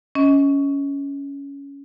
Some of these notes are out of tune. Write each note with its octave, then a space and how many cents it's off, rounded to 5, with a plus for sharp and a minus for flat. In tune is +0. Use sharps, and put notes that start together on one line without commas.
C#4 +15 D#5 +25